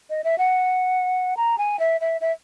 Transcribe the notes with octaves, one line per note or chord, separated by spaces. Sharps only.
D#5
E5
F#5
A#5
G#5
E5
E5
E5